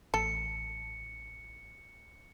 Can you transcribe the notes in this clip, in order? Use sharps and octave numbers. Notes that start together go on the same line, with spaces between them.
A1 A4 C#7